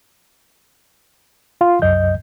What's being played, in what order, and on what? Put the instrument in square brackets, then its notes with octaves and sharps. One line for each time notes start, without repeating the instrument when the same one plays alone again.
[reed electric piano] F4 F5 C6
C2 F#2 D#5 G6